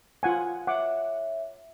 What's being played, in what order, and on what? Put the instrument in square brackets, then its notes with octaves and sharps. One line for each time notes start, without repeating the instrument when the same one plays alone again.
[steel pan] F4 F#5 G#5
[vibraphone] C#5 E5 [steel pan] F#5 D6